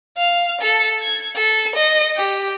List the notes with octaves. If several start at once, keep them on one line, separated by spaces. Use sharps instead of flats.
F5
A4
G#6
A4
D#5
G4